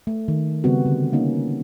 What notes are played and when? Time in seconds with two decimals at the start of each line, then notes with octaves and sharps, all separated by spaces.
0.07 A3
0.28 D#3
0.64 C#3 G3 B3 C4 F#4
0.86 D3
1.12 G3 A#3 C#4 D#4